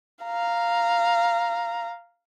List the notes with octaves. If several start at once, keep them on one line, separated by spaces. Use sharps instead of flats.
F5 A#5